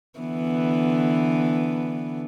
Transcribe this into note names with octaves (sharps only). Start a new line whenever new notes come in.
D3 E3 B3